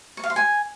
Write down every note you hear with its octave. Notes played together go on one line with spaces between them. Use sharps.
C#6
F5
C6
G#5